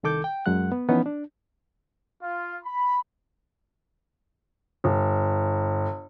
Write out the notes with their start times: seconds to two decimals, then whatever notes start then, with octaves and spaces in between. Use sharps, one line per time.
0.03 C2 D#3 A4 D6 G6
0.24 G5
0.46 F#2 F#3 G#3 F#5 F#6
0.72 B3
0.89 E3 F3 B3 C#4 D#4
1.06 D4
2.21 F4
2.63 B5
4.84 G1